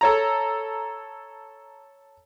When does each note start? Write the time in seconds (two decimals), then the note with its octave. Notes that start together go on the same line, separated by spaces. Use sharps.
0.01 A4 C#5 A#5